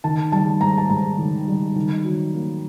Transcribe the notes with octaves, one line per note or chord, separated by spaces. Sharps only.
D#3 A5
G3 A5
G#2 A#5
A5
G#2 A#5
D#3
G3
D#3
F#3
A#3